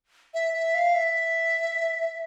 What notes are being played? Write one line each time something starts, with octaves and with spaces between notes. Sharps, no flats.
E5
E5
F5
E5